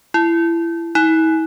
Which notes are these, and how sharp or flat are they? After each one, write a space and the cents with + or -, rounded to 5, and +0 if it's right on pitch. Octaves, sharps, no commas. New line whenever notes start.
E4 +25
E4 -45